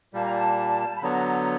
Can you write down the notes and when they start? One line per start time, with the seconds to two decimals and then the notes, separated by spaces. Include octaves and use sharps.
0.14 A#2 G3 A#3 A5
0.24 A#5
0.35 A5
0.95 B5
1.02 D3 F#3 B3 A#5